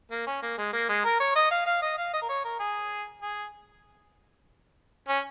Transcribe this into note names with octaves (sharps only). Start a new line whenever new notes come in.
A#3
C#4
A#3
G#3
A#3
G#3
A#4
C#5
D#5
F5
F5
D#5
F5
D#5
A#4
C#5
A#4
G#4
G#4
C#4